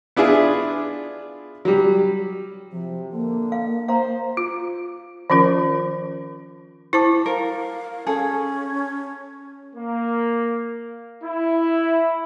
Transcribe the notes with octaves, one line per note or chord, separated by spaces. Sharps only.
B3 D4 E4 F4 G#4
F#3 G3
C3 F3
D3 A#3
F5
C5 F5 A#5 C6
F4
D#3 F3 C#4 F4 A#4
E4 C5 A5 D6
A#4 F5
C#4 G#4 A4
A#3
E4